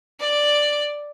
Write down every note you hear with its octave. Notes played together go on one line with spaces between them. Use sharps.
D5